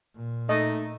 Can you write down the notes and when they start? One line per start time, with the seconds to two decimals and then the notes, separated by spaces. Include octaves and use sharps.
0.16 A#2
0.49 A3 D#4 D#5